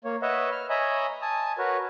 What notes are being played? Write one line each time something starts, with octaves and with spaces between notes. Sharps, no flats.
A#3 C#5
B4 C#5 D#5 E5 F#5
F6
C#5 D#5 E5 G#5 A#5 B5
G#5 A5 D#6
F#4 A#4 B4 C#5